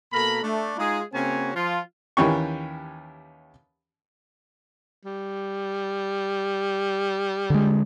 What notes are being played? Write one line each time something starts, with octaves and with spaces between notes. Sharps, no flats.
B2 A#3 A4 A#4 B5
A3 D4
G#3 D#4 F4 G#4
C#3 A#3 C4 C#4 F#4 G#5
F3 F4
D#2 E3 C#4 G4 C#6
G3
D3 G#3